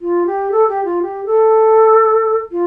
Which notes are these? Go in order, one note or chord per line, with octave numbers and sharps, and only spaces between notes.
F4
G4
A4
G4
F4
G4
A4
F4